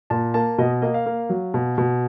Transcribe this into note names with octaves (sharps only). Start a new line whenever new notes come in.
A#2 A5
A#3 A5
B2 D#5
A#3 D#5
F5
A#3
F#3
B2
B2